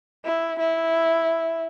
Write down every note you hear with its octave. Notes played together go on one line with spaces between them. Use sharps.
E4
E4